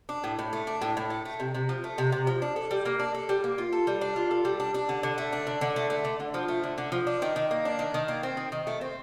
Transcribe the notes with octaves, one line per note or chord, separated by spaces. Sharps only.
D4
A2
A2
A3
D4
A2
A2
A3
A3
C3
C3
F3
A3
C3
C3
F3
D4
A4
G3
A#3
D4
A4
G3
A#3
F4
A4
G3
D4
F4
A4
G3
D4
D4
D3
D3
A3
D4
D3
D3
A3
A3
D3
D3
F3
A3
D3
D3
F3
D4
D#3
D#3
A#3
D4
D#3
D#3
A#3
C4
D#3
D#3
A3
C4